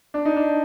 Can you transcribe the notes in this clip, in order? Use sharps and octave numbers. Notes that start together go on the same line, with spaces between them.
D4
D#4
D4